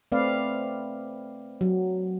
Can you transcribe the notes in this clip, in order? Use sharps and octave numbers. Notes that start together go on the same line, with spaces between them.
A3 C4 B4 D5 F5
F#3